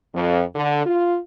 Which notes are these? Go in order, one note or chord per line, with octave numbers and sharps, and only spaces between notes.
F2
D3
F4